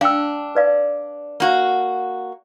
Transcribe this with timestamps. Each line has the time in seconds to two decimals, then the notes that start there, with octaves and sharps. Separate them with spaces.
0.01 D4 F5 G5 E6
0.55 B4 D5 F5
1.40 A#3 F#4